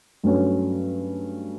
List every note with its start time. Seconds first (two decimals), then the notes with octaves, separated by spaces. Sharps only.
0.24 G2 F#3 A3 C#4